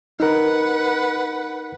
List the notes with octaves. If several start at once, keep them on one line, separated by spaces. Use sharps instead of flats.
D#4 A#4 B4 F#5